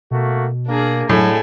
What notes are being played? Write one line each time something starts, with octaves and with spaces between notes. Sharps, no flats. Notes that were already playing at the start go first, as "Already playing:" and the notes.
B2 A3 A#3 F#4
A#3 D4 G#4
F#2 A2 D3 F#3 G#3 A4 G#5